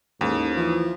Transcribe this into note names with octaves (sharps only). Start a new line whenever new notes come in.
A1 D#2 G#2
E3 F3